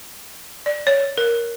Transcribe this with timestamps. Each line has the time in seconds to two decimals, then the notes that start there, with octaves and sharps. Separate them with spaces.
0.66 D5
0.87 C#5
1.18 A#4